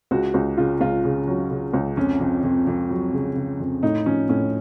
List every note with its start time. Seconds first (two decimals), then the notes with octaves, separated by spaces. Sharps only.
0.11 C#2 F#4
0.34 C#2
0.57 C#3 F4
0.81 C#2 F4
1.04 C#3
1.28 F#3
1.51 C#3
1.74 C#2
1.97 F2 C#4
2.20 F2
2.44 F2
2.67 F2
2.90 F#3
3.13 C#3
3.36 C#3
3.60 F2
3.83 A2 D#4
4.06 F3 C#4
4.29 A2 C#4